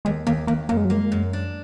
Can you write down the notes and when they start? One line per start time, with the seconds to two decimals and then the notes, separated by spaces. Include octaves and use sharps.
0.05 D#2 G#3
0.27 D#2 A#3
0.47 D#2 A#3
0.69 F#2 A#3
0.77 G#3
0.85 F#3
0.90 G#3 A#3
1.12 F#2
1.33 D4